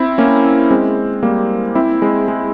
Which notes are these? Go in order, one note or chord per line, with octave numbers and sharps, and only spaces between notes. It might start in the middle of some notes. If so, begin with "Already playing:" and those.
Already playing: C4 E4
A#3 C#4
G#3 C4
G3 A#3
C4 E4
G#3 C4
G#3